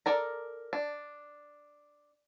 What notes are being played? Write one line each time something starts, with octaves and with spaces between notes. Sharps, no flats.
A4 A#4 D5 A#5
D4